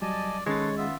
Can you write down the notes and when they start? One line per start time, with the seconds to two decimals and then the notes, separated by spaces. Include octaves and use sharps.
0.02 F#3 G3 D5 D#5 G#5 A5
0.46 D#3 G#3 C#4 A4 B4 C#5 C6 A6
0.78 B3 F4 E5